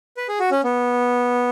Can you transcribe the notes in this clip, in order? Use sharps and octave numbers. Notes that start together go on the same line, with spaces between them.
B4
G#4
F#4
C#4
B3